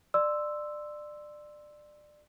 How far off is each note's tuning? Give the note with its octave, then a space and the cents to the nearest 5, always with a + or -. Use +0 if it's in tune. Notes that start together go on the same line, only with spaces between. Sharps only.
D5 +20 C6 +0 E6 +0